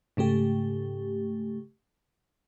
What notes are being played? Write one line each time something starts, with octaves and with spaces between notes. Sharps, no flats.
G#2 C#3 A3 G4